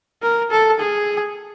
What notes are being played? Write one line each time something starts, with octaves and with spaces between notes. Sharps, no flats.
A#4
A4
G#4